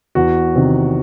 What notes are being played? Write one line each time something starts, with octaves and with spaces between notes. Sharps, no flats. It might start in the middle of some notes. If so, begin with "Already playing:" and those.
E2 F#4
C3 D#3